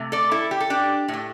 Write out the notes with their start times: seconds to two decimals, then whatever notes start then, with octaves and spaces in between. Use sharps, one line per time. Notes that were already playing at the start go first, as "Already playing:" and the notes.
Already playing: C3 A3
0.12 A4 D5
0.32 E4 A4
0.51 G4
0.60 A4
0.70 D4 G4
1.08 A2
1.13 A3